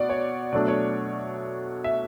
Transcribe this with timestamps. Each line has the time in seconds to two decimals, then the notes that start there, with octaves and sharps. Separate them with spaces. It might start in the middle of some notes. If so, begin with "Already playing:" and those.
Already playing: B2 D5 F#5
0.09 C#5
0.53 B2 F#3 A3 D4 D5
0.68 C#5
1.84 E5